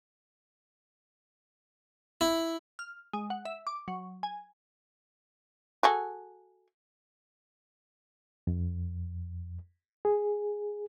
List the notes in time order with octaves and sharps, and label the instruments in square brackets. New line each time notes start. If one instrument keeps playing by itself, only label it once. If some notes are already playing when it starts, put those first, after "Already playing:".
[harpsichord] E4
[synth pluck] F6
G#3
F#5
E5
D6
F#3
G#5
[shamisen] F#4 G#4 A4
[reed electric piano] F2
G#4